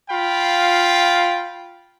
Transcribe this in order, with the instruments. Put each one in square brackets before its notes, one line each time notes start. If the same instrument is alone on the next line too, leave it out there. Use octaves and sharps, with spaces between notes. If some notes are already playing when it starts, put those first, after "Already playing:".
[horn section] F4 F5 G5 B5